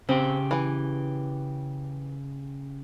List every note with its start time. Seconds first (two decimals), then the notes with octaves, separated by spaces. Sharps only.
0.09 C#3 C4 G4
0.51 E3 G#5